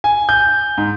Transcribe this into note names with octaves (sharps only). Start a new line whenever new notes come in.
G#5
G6
G#2